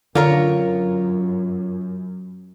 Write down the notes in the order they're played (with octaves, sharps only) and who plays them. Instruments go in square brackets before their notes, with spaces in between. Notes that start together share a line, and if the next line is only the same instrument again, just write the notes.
[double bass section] F#2 [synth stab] D3 [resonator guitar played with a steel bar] F4 A#4 C#5